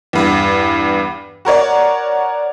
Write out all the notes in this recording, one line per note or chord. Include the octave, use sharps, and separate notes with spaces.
E2 G2
F#4 A#4 C#5 D5